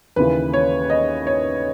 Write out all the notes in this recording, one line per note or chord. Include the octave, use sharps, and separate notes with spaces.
D#2 C#3 E3 B4
C#5
D#5
C#5